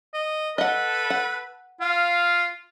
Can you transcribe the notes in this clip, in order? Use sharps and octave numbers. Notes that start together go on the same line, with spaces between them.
D#5
A4 B4 D#5 F#5
F#5
F4 F5